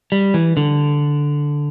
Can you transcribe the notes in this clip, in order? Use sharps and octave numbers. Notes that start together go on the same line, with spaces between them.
G3
E3
D3